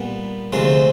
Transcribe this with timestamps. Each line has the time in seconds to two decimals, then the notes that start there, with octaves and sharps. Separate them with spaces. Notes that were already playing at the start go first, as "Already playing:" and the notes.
Already playing: A#2 G3 B3
0.53 D2 C3 F3 G#3